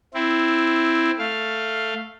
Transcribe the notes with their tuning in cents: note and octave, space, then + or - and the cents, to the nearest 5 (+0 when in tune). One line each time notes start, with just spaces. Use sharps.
C4 +0 E4 +0
A3 +10 F5 +0